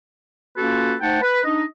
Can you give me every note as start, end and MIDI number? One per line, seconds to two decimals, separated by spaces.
0.57 0.94 58
0.57 0.94 61
0.57 0.94 65
0.57 0.94 66
0.57 0.94 69
0.57 0.94 71
1.01 1.20 57
1.01 1.20 63
1.01 1.20 72
1.01 1.20 78
1.01 1.20 79
1.01 1.20 81
1.22 1.40 71
1.45 1.63 62
1.45 1.63 63
1.45 1.63 75